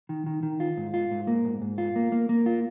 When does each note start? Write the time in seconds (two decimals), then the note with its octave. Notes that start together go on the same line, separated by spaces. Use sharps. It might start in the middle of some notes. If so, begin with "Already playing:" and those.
0.09 D#3
0.26 D#3
0.43 D#3
0.60 F4
0.77 G#2
0.94 F4
1.11 G#2
1.27 A#3
1.45 G#2
1.62 G#2
1.78 F4
1.96 A#3
2.12 A#3
2.29 A#3
2.46 F4